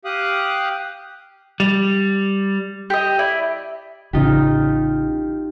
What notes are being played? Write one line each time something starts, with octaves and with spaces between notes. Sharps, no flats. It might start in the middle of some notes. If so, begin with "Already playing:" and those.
G4 F5 D#6 F#6
G3
G4 D#5
E4 D5
A1 C#3 D#4 F4 G4